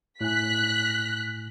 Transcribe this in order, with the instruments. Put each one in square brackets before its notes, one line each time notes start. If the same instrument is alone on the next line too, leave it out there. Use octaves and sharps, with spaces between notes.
[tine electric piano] A2 G#5 [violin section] F#6 B6